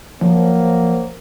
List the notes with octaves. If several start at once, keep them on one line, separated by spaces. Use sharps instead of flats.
F3 F#3 A#3